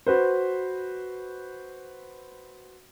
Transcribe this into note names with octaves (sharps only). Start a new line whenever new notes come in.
F#4 B4 C5